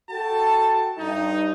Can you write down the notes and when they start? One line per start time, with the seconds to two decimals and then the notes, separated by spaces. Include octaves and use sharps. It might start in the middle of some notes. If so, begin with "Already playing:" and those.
0.10 F#4 A4 G5 A5
0.99 G2 D#4